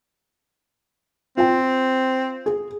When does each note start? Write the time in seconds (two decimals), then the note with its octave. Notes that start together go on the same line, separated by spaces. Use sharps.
1.37 C4 F4 G5
2.46 G#4